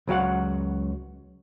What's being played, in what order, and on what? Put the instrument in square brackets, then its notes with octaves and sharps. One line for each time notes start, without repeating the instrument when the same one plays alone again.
[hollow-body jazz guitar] C#2 F#3 F#4 F5 F#5